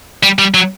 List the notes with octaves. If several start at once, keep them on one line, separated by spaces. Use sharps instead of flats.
G3
G3
F#3